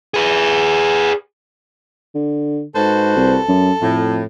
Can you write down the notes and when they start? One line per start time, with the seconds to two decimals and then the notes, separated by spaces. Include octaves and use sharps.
0.14 G#4 B4
2.15 D3
2.76 G#2 F#4 A4 B4 C5
3.17 C2
3.49 F#2
3.81 F2 A2